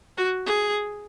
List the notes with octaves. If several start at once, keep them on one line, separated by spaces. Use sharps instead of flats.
F#4
G#4